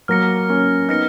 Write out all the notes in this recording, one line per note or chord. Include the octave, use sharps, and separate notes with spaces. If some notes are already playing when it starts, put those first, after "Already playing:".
F#3 A#3 F6 A#6 C#7
A#3 C#4
B3 D#4 F6 A#6 C#7